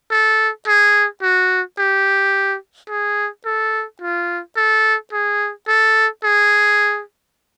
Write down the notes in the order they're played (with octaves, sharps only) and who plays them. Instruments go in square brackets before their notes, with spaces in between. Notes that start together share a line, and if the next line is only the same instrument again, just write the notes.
[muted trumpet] A4
G#4
F#4
G4
G#4
A4
F4
A4
G#4
A4
G#4